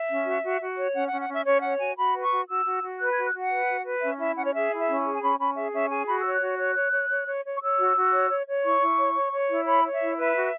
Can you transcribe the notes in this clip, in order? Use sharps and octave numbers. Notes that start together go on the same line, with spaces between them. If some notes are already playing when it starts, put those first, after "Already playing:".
Already playing: E5
C#4
F#4
F#4
F#4
C#5
C#4 F#5
F#5
C#4
F#5
C#4 E5
C#4 C#5
C#5 F#5
F#4 G#5
F#4 B5
B4
C#6
F#4
F#4 E6
F#4
F#4
B4 F#6
F#4 G#6
F#6
F#4 F#5
B4
F#4
B4
C#4 E5
E4 E5
C#4 F#5
C#5
G#4 E5
E4
E5
C#4
G#4
G#5
C#4 B5
C#4 B5
G#4 E5
C#4 E5
G#4 G#5
F#4 B5
E6
C#5
F#6
F#4
C#5 F#6
C#5
C#5
C#5
C#5
C#5
C#6
C#5 E6
F#4
F#4
C#5
C#5
C#5
E4 C#6
E4
C#5
C#5
C#5
E4
C#5 B5
C#5
E5
E4
B4 E5
F#4